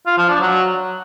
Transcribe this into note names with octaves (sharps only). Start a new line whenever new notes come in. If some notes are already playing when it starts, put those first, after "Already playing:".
F4
F3
D4
F#3